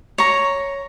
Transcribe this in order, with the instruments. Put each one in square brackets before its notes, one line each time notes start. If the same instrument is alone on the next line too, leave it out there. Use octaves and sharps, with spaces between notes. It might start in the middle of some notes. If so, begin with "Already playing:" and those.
[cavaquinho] C#5 A#5